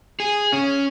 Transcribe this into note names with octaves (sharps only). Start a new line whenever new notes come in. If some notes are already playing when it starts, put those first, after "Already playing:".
G#4
C#4